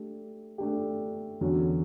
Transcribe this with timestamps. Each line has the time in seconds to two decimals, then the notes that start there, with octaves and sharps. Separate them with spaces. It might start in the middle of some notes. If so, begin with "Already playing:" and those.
Already playing: A3 D4 G4
0.58 A3 D4 G4
1.41 E2 D3 F#3 C#4 F#4